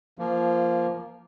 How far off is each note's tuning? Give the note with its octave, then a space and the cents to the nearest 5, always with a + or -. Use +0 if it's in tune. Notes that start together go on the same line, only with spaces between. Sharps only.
F3 -15 A#3 +0